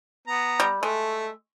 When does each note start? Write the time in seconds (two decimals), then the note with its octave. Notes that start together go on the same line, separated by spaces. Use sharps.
0.28 B3 A#5
0.60 G3
0.83 G#3 A3 E6